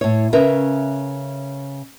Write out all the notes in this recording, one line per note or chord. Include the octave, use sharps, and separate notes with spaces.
A2 C#5
C#3 C#4 A#4 B4 E5